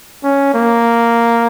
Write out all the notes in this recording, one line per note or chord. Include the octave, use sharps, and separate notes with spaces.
C#4
A#3